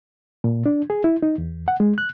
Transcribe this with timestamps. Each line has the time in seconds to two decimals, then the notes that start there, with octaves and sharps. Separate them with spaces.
0.44 A#2
0.66 D4
0.90 G#4
1.04 E4
1.23 D#4
1.38 E2
1.68 F#5
1.80 G#3
1.98 F#6